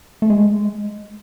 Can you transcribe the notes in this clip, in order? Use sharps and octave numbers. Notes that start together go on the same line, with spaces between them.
A3
G#3